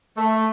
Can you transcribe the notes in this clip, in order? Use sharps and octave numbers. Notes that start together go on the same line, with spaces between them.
A3